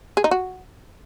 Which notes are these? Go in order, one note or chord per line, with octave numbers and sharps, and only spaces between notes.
G#4
D#4
F#4